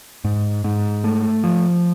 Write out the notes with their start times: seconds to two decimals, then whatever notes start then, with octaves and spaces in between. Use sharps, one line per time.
0.24 G#2
0.64 G#2
1.04 A3
1.44 F3